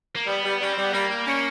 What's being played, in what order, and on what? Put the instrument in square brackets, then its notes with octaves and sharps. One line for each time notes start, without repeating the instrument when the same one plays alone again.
[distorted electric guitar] A#3
[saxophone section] G3 [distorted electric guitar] B3
[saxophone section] G3
[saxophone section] G3 [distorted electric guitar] C#4
[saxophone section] G3 [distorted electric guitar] C4
[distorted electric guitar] B3
[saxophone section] G3 [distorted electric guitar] A#3
[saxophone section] G3
C#4